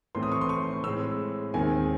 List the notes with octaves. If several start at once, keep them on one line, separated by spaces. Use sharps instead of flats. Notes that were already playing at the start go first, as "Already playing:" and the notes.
A2 E3 A3 C4 C6
D#6
C#6
C6
C#6
A2 G#3 C4 E6
D#2 D#3 G#3 C4 G#5